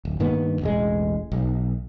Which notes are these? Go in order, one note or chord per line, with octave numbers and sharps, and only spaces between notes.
D1
G2 D#3 A#3 B3
E1 A1 G#3
B1